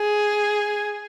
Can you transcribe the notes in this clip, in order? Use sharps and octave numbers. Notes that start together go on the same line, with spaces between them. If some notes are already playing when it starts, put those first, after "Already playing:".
Already playing: G#4